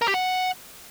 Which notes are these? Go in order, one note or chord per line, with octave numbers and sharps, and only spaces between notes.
A#4
G4
F#5